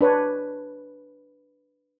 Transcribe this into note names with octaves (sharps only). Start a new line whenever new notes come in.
D4 B4 C#5